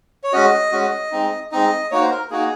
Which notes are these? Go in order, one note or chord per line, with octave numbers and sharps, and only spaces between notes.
C#5
G#3 C#4 F#4 D#5
G#3 C#4 F#4
G#3 C4 D#4
G#3 C4 D#4 D#5
A#3 D#4 F#4 C#5
C5
A#4
A#3 D#4 F#4 G#4